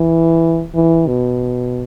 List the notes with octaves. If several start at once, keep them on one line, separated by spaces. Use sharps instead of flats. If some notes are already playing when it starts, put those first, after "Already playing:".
Already playing: E3
E3
B2